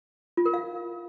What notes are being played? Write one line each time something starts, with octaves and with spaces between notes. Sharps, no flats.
F4
A#4
F5